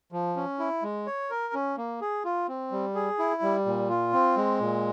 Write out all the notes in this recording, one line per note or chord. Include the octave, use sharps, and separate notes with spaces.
F3
C#4
E4
G#3
C#5
A#4
C#4
A#3
G#4
F4
C4
G3
G#4
E4
G3
A#2
F4
C4
G#3
A#2